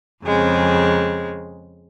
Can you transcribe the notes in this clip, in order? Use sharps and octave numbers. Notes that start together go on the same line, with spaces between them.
F2 C#3 G#3 C4